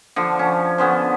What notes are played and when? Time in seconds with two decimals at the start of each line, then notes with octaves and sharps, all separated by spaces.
0.16 D3 F3
0.39 C#4
0.78 D3 B3 C#4 C5